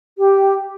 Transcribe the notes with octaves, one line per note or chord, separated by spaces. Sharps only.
G4